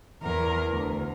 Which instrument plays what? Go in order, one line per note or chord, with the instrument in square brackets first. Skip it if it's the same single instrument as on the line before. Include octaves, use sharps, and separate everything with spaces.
[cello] E2 A#4
D2